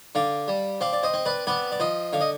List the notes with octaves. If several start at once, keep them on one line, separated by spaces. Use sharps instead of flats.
D3 D5 F5
G3
C4 D5 F5
D5
C5 D#5
C4
B4 D5
B3 B4 D5
D5
F3 C5 D#5
D3 F5
D#5